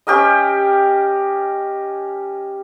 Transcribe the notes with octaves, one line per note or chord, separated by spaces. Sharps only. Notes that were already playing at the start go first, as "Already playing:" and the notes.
C#4 G4 A#4 D#5